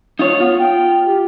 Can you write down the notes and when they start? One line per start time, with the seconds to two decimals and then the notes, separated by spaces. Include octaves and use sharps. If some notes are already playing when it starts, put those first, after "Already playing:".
0.19 D#4 F4 C#5
0.40 B3 F4
0.59 G5
1.05 G4